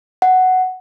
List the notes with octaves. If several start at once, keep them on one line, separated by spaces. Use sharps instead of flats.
F#5